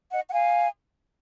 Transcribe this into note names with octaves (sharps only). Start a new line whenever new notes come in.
D#5 F#5
F#5
F5 G#5